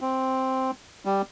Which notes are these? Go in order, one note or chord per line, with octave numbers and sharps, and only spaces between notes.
C4
G3